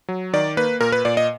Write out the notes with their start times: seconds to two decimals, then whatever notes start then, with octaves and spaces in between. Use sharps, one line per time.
0.08 F#3
0.33 D#3 D5
0.57 A#3 B4
0.81 A#2 A#4
0.92 B4
1.05 A#2 D5
1.17 D#5